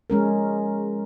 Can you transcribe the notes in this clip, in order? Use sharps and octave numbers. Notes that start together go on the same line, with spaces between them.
F3 G#3 C#4 A#4